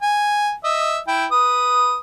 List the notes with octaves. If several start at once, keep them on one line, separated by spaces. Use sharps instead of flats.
G#5
D#5 E5
E4 G5
B4 D#6